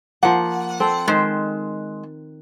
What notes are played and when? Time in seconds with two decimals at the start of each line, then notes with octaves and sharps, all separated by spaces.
0.23 F3 A#3 F#5
0.80 C4 A4
1.08 D#3 G#3 C5